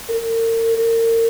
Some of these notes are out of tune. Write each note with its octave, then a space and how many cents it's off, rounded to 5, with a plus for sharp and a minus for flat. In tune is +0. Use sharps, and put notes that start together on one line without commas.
A#4 -40
A#4 -35